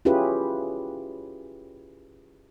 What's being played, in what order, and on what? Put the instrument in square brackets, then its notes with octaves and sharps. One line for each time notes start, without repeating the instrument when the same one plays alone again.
[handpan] C#4 E4 F4 G4 G#4 B4